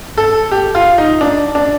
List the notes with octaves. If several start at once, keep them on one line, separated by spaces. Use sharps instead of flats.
A4
G4
F4
D#4
D4
D4